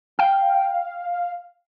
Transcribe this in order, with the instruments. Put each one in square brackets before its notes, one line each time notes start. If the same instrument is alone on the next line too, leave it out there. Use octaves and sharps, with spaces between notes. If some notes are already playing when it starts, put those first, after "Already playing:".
[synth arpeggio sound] F5 [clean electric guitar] G5